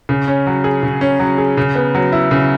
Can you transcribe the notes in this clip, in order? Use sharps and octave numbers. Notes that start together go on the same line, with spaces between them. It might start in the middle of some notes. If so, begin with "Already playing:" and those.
C#3
C#4
F#3
G#4
C#3
C#4
F#3
G#4
C#3
B3
F#3
E4
C#3